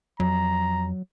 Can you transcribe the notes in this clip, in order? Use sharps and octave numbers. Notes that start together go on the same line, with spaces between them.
F2 F#3 A#5